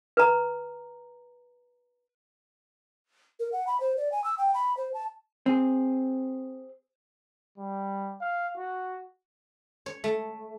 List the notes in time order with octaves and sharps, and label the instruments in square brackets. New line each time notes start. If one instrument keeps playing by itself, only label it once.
[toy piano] B4 A#5
[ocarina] A#4
F#5
B5
C5
D5
G#5
E6
G5
B5
C5
A5
[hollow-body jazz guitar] C4 G#4
[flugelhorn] G3
F5
F#4
[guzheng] C#5
A3